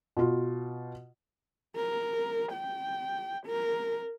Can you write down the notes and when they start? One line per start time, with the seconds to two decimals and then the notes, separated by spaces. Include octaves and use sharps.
0.17 B2 F4
1.77 A#4
2.53 G5
3.47 A#4